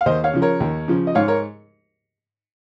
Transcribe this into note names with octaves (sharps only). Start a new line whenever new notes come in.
F5
D#2 C5 D#5
C#5 F5
C#3 F3
A#4 C#5
D#2
C#3 F3
D#5
G#2 C#5 F5
A#4 C#5